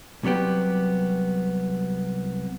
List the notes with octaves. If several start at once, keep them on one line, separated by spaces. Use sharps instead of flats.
C2 C3 F#3 B3 G4